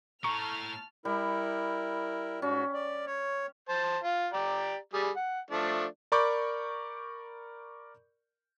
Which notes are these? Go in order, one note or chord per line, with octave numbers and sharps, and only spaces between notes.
A2 A5 A#5 C#6 F6
G3 E4 A#4
G#2 C#4 F#4
D5
C#5
C5 A5
F4
G4 D5 A#5
G3 G#4
F#5
F3 A3 D4
A#4 D5 B5 C#6 D6 G6